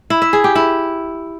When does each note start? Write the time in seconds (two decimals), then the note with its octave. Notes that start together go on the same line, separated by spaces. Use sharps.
0.10 E4
0.22 E5
0.33 G#4
0.44 G4
0.55 E4